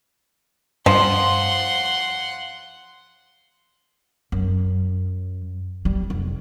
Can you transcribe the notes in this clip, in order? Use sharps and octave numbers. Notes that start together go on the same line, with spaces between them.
G2 F3 F#5 C6
F#2
G3
F1